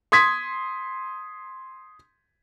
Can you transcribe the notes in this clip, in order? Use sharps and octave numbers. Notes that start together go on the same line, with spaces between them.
C6 D#6 G#6 B6